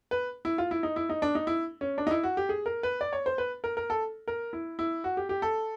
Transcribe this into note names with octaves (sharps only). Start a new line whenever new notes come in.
B4
E4
F4
E4
D#4
E4
D#4
D4
D#4
E4
C#4
D4
D#4
E4
F#4
G4
G#4
A#4
B4
D5
C#5
C5
B4
A#4
A#4
A4
A#4
E4
E4
F#4
G4
G4
A4